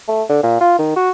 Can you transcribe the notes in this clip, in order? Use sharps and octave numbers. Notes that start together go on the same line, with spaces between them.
A3
D3
A#2
F4
D#3
F#4